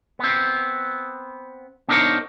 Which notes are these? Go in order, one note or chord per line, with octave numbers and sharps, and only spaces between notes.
B3 C4
B3 D4 D#4 A#4 C5 C#5